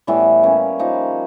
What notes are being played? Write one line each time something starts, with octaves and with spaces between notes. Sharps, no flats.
A2 E3 G3 B3
G3 A#3 C#4
F3 A#3 D#4